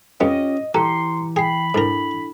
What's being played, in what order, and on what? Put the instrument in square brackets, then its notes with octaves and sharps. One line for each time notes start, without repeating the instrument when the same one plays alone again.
[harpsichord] F2 B3 [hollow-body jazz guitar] C#4 F4 G4 [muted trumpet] D#5
[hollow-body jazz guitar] E3 G4 [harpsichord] A4 [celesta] A#5 C#7 [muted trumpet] C6
[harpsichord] G#4 [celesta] G5 C7 [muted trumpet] B5
[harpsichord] G#2 A#4 [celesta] D4 E4 A4